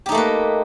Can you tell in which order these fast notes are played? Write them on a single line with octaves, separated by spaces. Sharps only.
G4 D#4 A3 A#3 B4